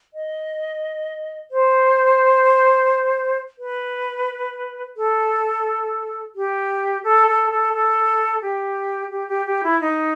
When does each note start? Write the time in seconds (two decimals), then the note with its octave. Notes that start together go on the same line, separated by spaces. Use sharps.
0.14 D#5
1.51 C5
3.59 B4
4.97 A4
6.35 G4
7.04 A4
7.27 A4
7.50 A4
7.73 A4
8.42 G4
9.11 G4
9.28 G4
9.46 G4
9.63 E4
9.81 D#4